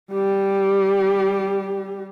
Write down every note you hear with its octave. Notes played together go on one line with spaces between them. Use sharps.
G3 G4